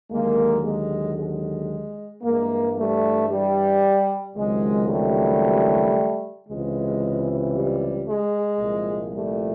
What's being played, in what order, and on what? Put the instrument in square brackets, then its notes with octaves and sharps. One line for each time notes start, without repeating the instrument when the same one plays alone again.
[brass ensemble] D#2 D3 F#3 G#3 A#3
G#3
G#3
G2 E3 G#3 A#3
G3 A3
G3
C#2 C3 D#3 F#3 G#3
G3 A3
C#2 C3 E3 G#3
G3
G#3
C2 A#2 F3
G3 A3